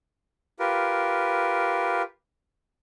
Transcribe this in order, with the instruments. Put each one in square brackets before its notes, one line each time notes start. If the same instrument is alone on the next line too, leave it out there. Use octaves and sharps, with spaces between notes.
[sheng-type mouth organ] F4 G4 A#4 B4